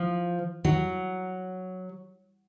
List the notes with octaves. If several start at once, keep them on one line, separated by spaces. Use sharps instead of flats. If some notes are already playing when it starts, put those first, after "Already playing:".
Already playing: F3
F#3